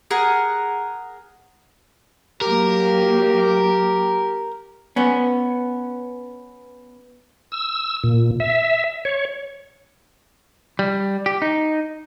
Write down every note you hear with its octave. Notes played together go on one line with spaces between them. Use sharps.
G#4 A#4 F#5
F#3 A#3 G4 A#4
B3 C#4
E6
A#2
E5
C#5
G3
G4
D#4